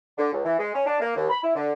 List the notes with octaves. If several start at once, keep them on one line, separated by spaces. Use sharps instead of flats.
D3
C#2
E3
G#3
C#4
D4
A#3
D#2
B5
E4
D3